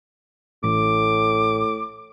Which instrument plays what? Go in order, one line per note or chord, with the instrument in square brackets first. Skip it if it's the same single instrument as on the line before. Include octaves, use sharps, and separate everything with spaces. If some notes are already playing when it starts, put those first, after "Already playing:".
[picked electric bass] A1 [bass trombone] A2 [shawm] D6